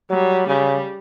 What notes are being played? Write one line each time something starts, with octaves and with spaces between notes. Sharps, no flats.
F#3 G3
C#3 G3